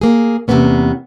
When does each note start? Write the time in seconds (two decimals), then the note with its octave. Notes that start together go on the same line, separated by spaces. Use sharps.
0.01 A#3 G#4
0.48 E2 C3 G3 A#3 B3 C#4